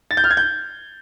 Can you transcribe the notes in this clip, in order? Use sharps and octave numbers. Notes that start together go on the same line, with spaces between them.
A6
G6
F6
G#6
G6